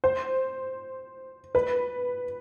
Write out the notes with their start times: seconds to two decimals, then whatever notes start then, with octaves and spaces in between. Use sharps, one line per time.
0.04 C5
1.55 B4